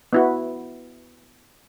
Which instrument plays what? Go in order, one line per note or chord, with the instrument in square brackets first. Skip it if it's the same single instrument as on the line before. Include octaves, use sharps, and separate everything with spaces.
[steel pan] B3 E4 F#4